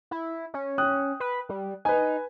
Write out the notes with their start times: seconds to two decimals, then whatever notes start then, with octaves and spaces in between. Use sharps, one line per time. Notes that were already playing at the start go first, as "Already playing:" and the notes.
0.11 E4
0.54 C#4
0.78 G5 D#6 F#6
1.20 B4
1.49 G3
1.85 D#4 B4 G#5